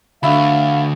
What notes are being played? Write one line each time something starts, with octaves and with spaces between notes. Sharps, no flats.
D2 D3 E5 F5 B5